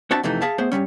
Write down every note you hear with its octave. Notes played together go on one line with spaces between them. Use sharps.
C4 D4 F#4 C5 E5 A5
F2 C3 E3 A3 D#4
G#4 E5 F5 A5
A3 B3 G#4 C5
G2 C3 G3 C#4